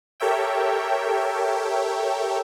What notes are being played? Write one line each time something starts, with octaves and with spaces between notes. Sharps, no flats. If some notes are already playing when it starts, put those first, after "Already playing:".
G4 A4 A#4 C#5 E5 G5